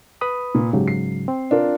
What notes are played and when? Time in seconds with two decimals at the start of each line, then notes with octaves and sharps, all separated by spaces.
0.21 B4 B5 D#6
0.55 A#2
0.73 G#2 C#3 F#3 G4
0.88 C7
1.28 C4
1.51 D4 F4 A#4